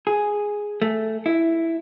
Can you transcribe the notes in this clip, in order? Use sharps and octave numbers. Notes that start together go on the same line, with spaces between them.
G#4
A3
E4